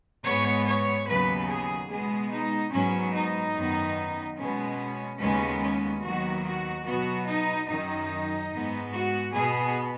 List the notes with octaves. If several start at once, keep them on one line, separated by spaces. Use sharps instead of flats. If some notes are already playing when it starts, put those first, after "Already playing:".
G#2 G#3 B3 C#5
C#5
D#2 C#3 F#3 B3 B4
G#4
B2 G#3 B3 G#4
D#4
G#2 F#3 B3 C#4
D#4
F#2 D#3 B3
B2 G#3 B3 C#4
D#2 C#3 G#3 B3 C#4
C#4
D#2 D#3 F#3 B3 F#4
F#4
B2 F#3 B3 F#4
D#4
F#2 D#3 F#3 D#4
G#2 G#3 B3
F#4
B2 B3 G#4